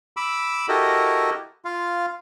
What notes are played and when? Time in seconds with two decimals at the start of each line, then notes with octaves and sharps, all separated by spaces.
0.17 B5 D6 E6
0.69 E4 F#4 G4 A4 A#4 D#5
1.65 F4 F5